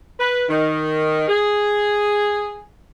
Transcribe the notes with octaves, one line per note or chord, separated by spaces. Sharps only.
B4
D#3
G#4